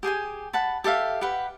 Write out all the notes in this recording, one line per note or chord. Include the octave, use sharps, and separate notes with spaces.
G4 G#4 G5 G#5
F#5 A5 B5
G4 A4 E5 F5
G4 B4 F#5